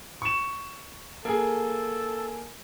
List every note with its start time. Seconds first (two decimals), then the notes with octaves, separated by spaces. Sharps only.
0.22 C#6 E7
1.25 A#3 G#4 A4